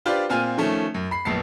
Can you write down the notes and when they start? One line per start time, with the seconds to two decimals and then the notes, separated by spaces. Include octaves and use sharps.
0.05 D4 F4 G4 B4 C5 D5
0.29 A#2 C4 F4 G#5 F6 D#7
0.58 D#3 F3 A3 C#4
0.94 F#2
1.11 B5 C7
1.25 A#1 F#2 B3 A5 C7